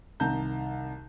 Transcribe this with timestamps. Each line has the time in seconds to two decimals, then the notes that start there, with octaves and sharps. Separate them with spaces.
0.20 C2 D#3 A5 A#5 G6